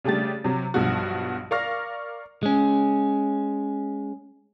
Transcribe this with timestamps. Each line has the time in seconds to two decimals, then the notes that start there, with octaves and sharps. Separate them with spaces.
0.04 C#3 G3 A3 D4 G4 A6
0.44 C3 F#3
0.74 B1 G2 B2 F3 F#4
1.51 A#4 D5 F5 C#6 F6 A#6
2.43 G#3 C#4